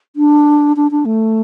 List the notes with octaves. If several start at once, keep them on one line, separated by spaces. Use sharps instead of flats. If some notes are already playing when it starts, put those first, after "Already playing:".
D4
D4
D4
A3